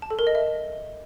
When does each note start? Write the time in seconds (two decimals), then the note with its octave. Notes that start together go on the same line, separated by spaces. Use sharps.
0.02 A5
0.10 A4
0.19 A#4
0.27 D#5
0.35 E5